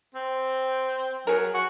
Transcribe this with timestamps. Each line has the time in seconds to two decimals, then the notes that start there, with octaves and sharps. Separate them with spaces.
0.15 C4
1.27 F#3 G#4 A#4
1.54 F#4